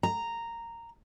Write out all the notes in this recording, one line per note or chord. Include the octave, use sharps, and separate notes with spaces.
A#5